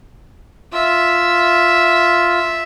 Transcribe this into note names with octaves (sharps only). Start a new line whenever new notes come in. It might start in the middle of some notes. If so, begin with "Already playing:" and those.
F4 E5